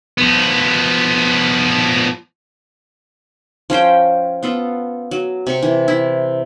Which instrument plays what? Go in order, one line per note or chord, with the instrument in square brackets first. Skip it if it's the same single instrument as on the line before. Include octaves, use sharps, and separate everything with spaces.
[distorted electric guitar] F3 B3
[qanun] F3 C#4 C5 G5
B3 F4 A4
F#3
C3 C#6
E3
E4